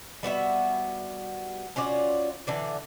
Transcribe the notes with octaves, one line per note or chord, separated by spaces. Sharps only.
G3 B3 F#4 E5
C#4 F4 F#4 D5
D3 E3 D5